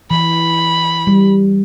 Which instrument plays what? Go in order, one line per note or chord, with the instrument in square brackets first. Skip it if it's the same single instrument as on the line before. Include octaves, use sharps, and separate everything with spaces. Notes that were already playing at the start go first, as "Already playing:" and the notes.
[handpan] E3 [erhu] B5
[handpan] G3